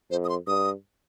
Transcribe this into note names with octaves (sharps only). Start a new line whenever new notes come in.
F2 C5
D#6
C6
G2 D#6